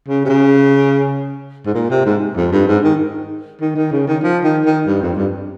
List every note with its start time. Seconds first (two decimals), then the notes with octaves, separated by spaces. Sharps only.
0.08 C#3
0.25 C3
0.29 C#3
1.66 G#2
1.75 A#2
1.90 C3
2.06 G#2
2.37 F2
2.52 G2
2.68 G#2
2.84 D#3
3.61 D#3
3.76 D#3
3.92 C#3
4.07 D#3
4.23 F3
4.44 D#3
4.65 D#3
4.86 G2
5.02 F2
5.16 G2